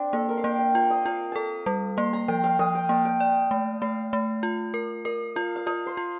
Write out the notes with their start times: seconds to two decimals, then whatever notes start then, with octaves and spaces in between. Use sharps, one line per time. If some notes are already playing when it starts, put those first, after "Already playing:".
Already playing: C4 D4
0.13 A#3 A4
0.29 A#4
0.37 F5
0.44 A#3 G5
0.59 G5
0.75 F4 F5
0.90 D#5
1.05 F4 F5
1.32 A4 A5 A#5
1.66 G3
1.97 A#3 C6
2.13 A#5
2.28 F3 G5
2.44 F5
2.59 F3 D#5
2.75 G5
2.89 A#3 A5
3.05 G5
3.20 D5
3.51 A3
3.82 A3 F5
4.13 A3
4.43 F4
4.74 A#4
5.05 A#4 D#5
5.36 F4 F5
5.56 F5
5.66 F4 D#5
5.86 C5
5.97 F4